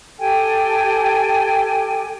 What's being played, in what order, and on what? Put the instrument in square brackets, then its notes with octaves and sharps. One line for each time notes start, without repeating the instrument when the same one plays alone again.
[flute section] G4 A4 G5 G#5